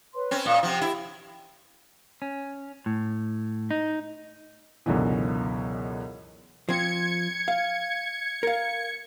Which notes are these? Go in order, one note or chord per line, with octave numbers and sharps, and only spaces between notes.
B4 C#5 C6
C4 C#4
A#2 F5 D#6
C3 F3 G4 F#5 G5
E4
C#4
A2
D#4
C#2 F#2 B2 D3 E3
F3 C4 G#6 C#7
F5
A#4 F5